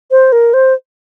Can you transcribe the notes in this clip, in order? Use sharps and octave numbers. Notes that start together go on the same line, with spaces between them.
C5
A#4
C5